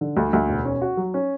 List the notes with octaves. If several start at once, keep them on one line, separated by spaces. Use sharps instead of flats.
D3
D2
D2
E1
C#4
F#4
F#3
C#4